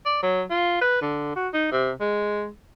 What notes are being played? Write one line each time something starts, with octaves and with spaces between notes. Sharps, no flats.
D5
F#3
F4
B4
D3
F#4
D#4
C3
G#3